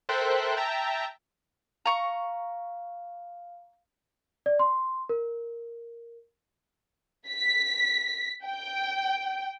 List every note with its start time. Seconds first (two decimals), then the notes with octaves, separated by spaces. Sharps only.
0.09 A4 A#4 C5 E5 G5 F#6
0.56 E5 G5 A5 A#5
1.86 F5 A#5 C#6
4.46 D5
4.59 C6
5.09 A#4
7.29 B6
8.45 G5